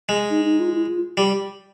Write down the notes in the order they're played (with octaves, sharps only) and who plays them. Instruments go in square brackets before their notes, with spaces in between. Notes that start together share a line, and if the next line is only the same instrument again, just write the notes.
[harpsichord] G#3
[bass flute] D#4
D#4
F4
E4
F4
[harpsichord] G3 [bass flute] G4